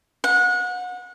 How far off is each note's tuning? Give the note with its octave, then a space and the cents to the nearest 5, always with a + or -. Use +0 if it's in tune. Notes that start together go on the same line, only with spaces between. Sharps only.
F#5 -30